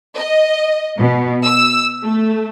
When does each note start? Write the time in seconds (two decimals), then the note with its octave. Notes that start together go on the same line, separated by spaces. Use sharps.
0.16 D#5
0.99 B2
1.44 E6
2.03 A3